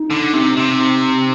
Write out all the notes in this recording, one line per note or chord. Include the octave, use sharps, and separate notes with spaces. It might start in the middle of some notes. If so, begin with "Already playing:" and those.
Already playing: D#4
D3
C3
C3